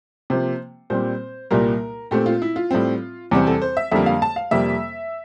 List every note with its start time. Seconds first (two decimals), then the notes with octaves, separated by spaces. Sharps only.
0.30 C3 F3 A#3 C5
0.90 A#2 G3 C4 C5
1.51 C2 A#2 G3 A#3 A#4
2.11 A#2 A3 C4 G4
2.26 F4
2.42 E4
2.56 F4
2.71 A2 G3 C4
3.31 E2 C3 G3 C4
3.47 A4
3.62 C5
3.77 E5
3.91 F2 D3 G3 A#3 E5
4.06 F5
4.22 A5
4.36 F5
4.51 F2 C3 G3 A#3 E5